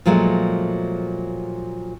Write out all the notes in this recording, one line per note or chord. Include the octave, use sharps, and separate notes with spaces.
A#2 F3 F#3 G#3 A3